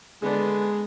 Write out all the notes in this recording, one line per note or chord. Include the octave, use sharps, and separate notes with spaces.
D3 G#3 B3 D4